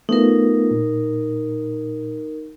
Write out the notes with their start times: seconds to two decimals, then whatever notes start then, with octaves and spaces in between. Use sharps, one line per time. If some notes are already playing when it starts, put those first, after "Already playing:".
0.09 A3 B3 D#4 F4 A#4
0.71 A#2